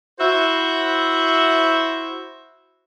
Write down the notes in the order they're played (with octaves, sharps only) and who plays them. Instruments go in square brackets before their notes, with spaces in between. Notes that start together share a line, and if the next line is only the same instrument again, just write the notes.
[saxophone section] E4 F#4 C5 E5